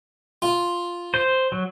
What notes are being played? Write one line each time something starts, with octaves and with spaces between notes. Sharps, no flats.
F4
C5
F#3